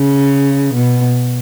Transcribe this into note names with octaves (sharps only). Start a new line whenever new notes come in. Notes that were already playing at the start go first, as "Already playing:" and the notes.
Already playing: C#3
B2